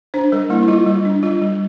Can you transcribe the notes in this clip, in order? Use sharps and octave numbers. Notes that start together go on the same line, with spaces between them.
D4 C5
G3 A#4
A#3 E4
E4
G3 F4
G3 F4
D4
G3 F4
G3